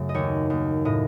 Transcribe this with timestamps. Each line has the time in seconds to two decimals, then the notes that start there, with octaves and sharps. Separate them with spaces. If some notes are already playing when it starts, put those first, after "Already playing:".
Already playing: F#2 C#3 A3
0.09 D#5
0.14 D#2 C#5
0.50 D#2
0.85 A2 D#5